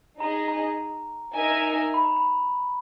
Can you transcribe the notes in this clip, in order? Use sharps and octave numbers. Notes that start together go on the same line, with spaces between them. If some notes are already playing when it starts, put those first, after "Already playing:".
D#4 G#4 D#5 A#5
A#5
D#4 A#4 E5 G#5
B5
A#5
B5